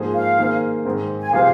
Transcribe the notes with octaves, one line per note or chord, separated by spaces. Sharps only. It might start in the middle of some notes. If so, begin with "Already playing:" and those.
Already playing: G#2 F3 A#3 G#4 C5
F5
D#3 A#3 G#4 C5
G#2 D#3 C4 G#4
G#5
C3 F3 C4 G#4 C5 F5